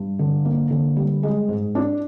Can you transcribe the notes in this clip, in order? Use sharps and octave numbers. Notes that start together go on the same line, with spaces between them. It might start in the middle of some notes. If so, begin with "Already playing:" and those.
Already playing: G2
D3
A#3
D3
G3
G#3
G#2
D4